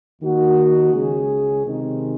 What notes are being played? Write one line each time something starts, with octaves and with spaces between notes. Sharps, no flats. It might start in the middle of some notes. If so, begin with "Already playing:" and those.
D#2 D#3 A#3 D#4 F#4
C#2 C#3 G#3 C#4 G#4
C3 D#3 G#3 D#4